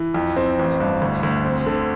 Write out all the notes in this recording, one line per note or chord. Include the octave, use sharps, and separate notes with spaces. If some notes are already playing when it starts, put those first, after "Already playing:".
Already playing: E3
F2
C4
A1
G2
D2
D2
C4
D3